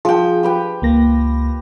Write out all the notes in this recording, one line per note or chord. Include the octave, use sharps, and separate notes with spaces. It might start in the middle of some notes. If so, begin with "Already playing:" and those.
F3 G#4 G5
G4 B4 G5
C#2 A#3 A#6